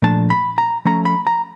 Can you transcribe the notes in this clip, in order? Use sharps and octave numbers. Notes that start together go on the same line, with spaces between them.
A#2 F3 A3 D4 A5
B5
A#5
F3 A3 C#4 A#5
B5
A#5